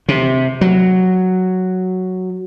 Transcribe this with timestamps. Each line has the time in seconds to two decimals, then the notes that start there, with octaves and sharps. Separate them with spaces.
0.09 C3
0.61 F#3